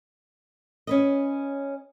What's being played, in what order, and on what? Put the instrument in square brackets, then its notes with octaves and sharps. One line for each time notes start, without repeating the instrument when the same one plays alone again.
[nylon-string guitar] C#4 B4 D#5